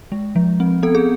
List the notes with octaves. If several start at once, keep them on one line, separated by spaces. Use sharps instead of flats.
G#3
F3
C4
B3 A4
G#4